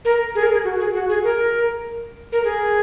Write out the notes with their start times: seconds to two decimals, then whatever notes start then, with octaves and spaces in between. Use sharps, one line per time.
0.05 A#4
0.35 G#4
0.43 A#4
0.53 G#4
0.64 F#4
0.80 G#4
0.94 F#4
1.09 G#4
1.24 A#4
2.32 A#4
2.44 G#4